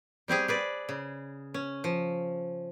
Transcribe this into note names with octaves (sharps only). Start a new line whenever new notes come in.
G3 C4 G4 G#4
G#4 B4 D5
C#3
C#4
F3